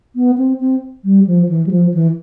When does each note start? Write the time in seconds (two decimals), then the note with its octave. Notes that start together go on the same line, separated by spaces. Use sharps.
0.16 B3
0.38 C4
0.60 C4
1.04 G3
1.27 F3
1.49 E3
1.66 G3
1.71 F3
1.94 E3